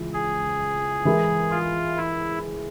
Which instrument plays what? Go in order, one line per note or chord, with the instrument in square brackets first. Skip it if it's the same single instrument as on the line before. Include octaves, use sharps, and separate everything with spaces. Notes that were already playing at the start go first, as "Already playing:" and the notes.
Already playing: [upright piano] C#2 C#3 E3
[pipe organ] G#4
[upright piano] E3 G#3 E4 A#4
[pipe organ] F4
E4